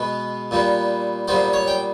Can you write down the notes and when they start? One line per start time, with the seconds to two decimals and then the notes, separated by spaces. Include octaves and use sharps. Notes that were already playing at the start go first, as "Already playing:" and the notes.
Already playing: B2 G#3 B3
0.51 A#2 G3 B3
1.28 A#2 G3 B3 C5
1.53 C#5
1.68 G5